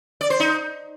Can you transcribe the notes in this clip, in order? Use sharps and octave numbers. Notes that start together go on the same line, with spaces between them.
D5
C5
D#4